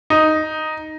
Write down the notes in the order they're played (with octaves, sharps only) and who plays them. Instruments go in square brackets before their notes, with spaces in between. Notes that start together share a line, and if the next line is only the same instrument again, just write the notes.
[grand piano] D#4